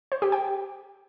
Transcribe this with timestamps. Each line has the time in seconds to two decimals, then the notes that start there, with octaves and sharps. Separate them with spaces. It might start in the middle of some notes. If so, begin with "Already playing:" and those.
0.12 C5
0.22 G4
0.32 G5